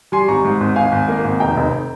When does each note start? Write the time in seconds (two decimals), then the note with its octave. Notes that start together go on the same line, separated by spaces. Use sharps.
0.12 G3 G#5 C6
0.28 G#1 A#5 C#6
0.45 G#2
0.61 G#1
0.76 G#1 F5 G#5
0.92 G#1
1.08 A#3
1.24 G#1
1.40 F1 G5 A#5
1.57 F1